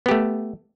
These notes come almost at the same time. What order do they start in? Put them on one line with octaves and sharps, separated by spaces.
B3 G4 A3